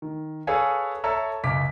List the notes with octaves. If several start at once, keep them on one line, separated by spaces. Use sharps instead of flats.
D#3
G#4 A4 B4 C#5 F5 G#5
A4 C#5 E5 A5 A#5 E6
C#2 F#2 D6 B6